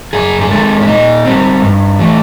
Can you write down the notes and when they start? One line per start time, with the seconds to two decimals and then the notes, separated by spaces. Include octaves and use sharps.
0.13 F#2 G#4
0.41 G#4
0.50 D#3 G#3 A4
0.81 E4
0.87 A#2 D#4
1.25 G3 C4
1.62 G2
1.99 E3 A3